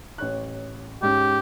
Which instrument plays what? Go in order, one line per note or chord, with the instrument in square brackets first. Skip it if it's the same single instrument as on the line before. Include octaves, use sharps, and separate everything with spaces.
[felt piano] A1 C#5 F#6
[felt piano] G#2 C#4 [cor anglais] G4